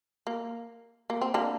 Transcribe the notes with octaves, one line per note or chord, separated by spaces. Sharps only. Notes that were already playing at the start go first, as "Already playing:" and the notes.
A#3
A#3
C4
A#3 D4